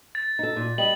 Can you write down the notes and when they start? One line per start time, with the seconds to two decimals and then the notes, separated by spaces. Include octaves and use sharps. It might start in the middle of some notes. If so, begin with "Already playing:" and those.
0.15 A6
0.39 D#4 A4
0.56 A#2
0.78 G3 D#5 F#7